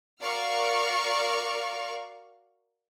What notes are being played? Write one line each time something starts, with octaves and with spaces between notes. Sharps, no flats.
F#4 A#4 D5 F5 C#6 F6